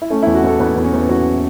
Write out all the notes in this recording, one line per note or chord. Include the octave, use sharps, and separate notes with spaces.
E4
A3 C#4
E2 E4
F#4
E2 A4
E2 B4
E2 B3
C#4
E2
E2 F#4